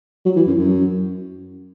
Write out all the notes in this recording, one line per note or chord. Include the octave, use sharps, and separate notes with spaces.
F#3
E3
F#2
F#2